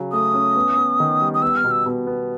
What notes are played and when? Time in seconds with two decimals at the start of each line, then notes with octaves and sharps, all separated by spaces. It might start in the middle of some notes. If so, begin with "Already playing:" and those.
Already playing: C#3 F#3
0.12 A3 D#6
0.34 C#4
0.56 B3
0.77 B3
1.00 D#3
1.21 G3
1.34 D#6
1.42 B3 E6
1.57 F6
1.64 B2
1.71 E6
1.86 B2
2.07 B3